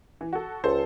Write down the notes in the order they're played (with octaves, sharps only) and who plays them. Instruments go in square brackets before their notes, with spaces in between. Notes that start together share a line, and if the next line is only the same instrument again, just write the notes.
[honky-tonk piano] E3
F#4 A4
[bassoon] C#2 [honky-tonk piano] A4 C5